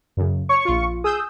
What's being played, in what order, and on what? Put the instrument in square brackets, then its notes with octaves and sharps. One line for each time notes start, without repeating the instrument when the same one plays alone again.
[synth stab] F#2 C#3
[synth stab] C#5 [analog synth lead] C#6
[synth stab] A#1 F4
[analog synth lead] G#4 [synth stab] D#6 E6 G6